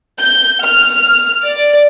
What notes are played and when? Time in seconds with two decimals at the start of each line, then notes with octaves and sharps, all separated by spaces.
0.18 G6
0.62 F6
1.45 D5